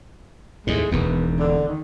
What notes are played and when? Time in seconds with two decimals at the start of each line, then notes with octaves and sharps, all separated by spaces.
0.67 D#2 A2 G#3
0.92 E1 D#2 B3
1.39 D3
1.68 D#3